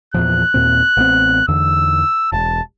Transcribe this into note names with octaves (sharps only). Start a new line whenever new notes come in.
E2 A#2 F3 F#6
D#2 A#2 C4
A1 B3 C4
E2 D3 E6
E1 A5